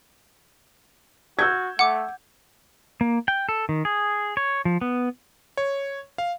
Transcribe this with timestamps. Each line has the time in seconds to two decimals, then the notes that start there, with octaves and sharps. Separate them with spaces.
1.39 F#4 E6 G6 G#6
1.79 A3 F#5 D6
3.01 A#3
3.28 G5
3.49 A4
3.69 D#3
3.85 G#4
4.37 C#5
4.65 F3
4.81 B3
5.57 C#5
6.18 F5